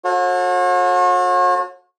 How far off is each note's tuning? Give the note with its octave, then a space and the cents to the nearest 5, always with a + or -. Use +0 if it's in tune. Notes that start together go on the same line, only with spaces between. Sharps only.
F#4 -40 A4 +0 C#5 -40